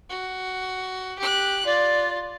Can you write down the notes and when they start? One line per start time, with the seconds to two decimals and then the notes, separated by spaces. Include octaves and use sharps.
0.10 F#4
1.19 G4 F#6
1.65 F4 D5